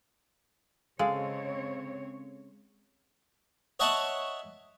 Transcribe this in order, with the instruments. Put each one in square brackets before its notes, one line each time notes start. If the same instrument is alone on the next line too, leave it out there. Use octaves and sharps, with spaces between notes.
[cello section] C#3 C4 C#5 [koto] G#3 [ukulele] A4 F5
[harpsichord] C#5 D#5 E5 F#5 A5 C#6